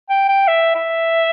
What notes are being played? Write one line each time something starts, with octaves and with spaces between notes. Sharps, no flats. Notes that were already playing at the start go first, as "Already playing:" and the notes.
G5
G5
E5
E5